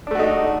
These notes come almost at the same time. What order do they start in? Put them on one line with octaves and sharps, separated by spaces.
D4 A3 F#4 D#4